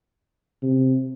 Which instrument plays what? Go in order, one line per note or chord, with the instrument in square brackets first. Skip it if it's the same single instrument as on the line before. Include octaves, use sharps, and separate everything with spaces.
[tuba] C3